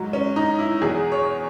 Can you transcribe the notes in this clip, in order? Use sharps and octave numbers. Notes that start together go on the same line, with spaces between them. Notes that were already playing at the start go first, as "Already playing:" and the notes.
Already playing: G#2 F#3
C#4
D#4
E4
E2 B2 F#3 G#4
C#5